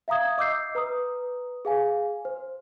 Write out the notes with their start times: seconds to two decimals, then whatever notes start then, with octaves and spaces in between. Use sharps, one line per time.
0.08 E5 F5 A#5 D#6 G#6
0.38 D#5 D6 E6 G6 C7
0.75 B4 A#5 D#6
1.65 G#4 F5 G#5
2.25 C5